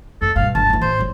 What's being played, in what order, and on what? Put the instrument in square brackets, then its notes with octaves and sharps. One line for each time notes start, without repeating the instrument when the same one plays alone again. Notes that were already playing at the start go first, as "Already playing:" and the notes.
[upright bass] F#2 [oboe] A4
[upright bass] G2 B2 [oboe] F5
[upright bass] G1 [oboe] A5
[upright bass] E3 F4
[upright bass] A1 [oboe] C5
[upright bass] G1 F#3